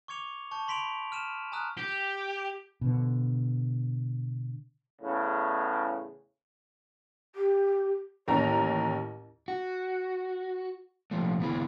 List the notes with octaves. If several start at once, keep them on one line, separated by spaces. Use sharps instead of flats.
C#6 D6 G#6 C#7 F7
A5 C#6 G6
B5 C6 B6 D7 F7 F#7
F6 D#7 E7
G#5 A#5 D#6 F6 F#6
G4
B2 D3
E2 A2 C#3
G4
A1 D#2 C#5 A#5
F#4
A#2 F3 A3
D3 B3 E4 G#4